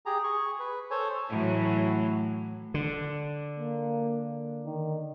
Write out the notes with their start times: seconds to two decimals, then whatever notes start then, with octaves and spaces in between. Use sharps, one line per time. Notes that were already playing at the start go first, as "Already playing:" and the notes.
0.06 G4 G#4 A#5
0.24 G#4 C#6
0.59 B4
0.91 A4 C5 C#5 G#5
1.30 A2 E3 F#3
2.74 D3
3.59 A#3
4.66 D#3